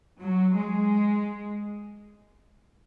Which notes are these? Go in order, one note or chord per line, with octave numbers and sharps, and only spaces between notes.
F#3
G#3